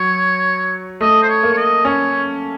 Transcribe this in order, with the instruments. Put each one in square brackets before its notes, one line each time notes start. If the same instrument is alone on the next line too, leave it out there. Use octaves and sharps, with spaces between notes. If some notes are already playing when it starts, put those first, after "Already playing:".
Already playing: [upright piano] F#3 [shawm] C#5
[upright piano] A3 [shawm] D#5
[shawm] C5
C#5
[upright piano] A#3
[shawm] C#5
D#5
[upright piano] C#4 [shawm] C#5